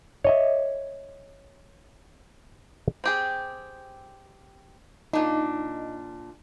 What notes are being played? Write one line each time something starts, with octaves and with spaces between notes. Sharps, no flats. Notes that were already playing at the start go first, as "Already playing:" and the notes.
C#5 D#5 E5
C4 G4 G#4
A#2 D4 D#4